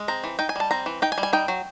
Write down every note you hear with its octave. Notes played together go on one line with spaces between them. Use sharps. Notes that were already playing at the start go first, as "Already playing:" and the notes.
Already playing: G#3
C4 A#5
E3
D#4 G5
G#5
G3 A5
C4 A#5
E3
D#4 G5
G#5
G3
G#5
D#4 G5
F#3